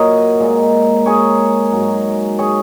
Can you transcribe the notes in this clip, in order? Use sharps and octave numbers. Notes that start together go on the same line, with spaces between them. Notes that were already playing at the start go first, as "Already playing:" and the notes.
Already playing: A#2 F#3 A#4 C#5 D#5 F#5
A#2 G#3
G#4 C#5
G#2 F#3
G#4 C#5